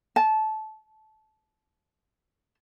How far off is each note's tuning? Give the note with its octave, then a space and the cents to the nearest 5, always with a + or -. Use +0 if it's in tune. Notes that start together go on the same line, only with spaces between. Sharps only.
A5 -20